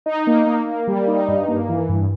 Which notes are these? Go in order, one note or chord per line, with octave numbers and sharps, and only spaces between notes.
D#4
A#3
A#3
A#3
G3
D#4
G2
A#3
E3
G2